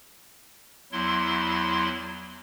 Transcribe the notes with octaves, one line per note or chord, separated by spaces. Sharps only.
E2 F#3 E4 C6